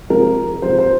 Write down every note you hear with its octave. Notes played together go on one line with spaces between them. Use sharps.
C3 F3 G#3 A#4
C3 F3 G#3 C5
C5